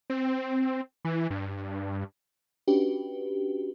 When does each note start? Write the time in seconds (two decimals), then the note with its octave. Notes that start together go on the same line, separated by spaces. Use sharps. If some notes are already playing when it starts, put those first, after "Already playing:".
0.10 C4
1.05 E3
1.30 G2
2.67 C#4 D4 F#4 G4 B4